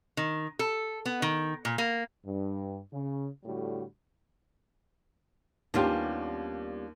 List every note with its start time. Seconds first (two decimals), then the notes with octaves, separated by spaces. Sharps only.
0.17 D#3
0.59 A4
1.06 B3
1.22 D#3
1.65 A#2
1.78 A#3
2.25 G2
2.93 C#3
3.44 A2 D3 G3 F#4
5.74 D#2 G3 B3 C#4 D4 F4 G4